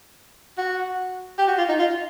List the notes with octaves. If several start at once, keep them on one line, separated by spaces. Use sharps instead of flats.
F#4
G4
F#4
F4
D#4
F4